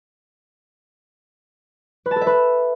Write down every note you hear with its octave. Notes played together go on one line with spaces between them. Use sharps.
B4
A5
A4
E5
B4